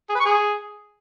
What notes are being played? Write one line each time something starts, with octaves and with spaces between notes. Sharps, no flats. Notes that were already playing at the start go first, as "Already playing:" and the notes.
G#4
B4
C#6
G#4